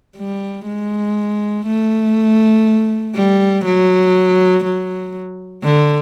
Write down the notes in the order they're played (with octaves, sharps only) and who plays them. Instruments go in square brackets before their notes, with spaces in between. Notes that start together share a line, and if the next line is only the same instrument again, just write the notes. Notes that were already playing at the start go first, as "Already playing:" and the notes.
[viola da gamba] G3
G#3
A3
G3
F#3
F#3
D3